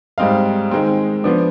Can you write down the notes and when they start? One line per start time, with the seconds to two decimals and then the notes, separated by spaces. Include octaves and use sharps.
0.18 G#2 G3 C4 D#4 F5
0.71 D#3 G#3 C4
1.24 F3 B3 D4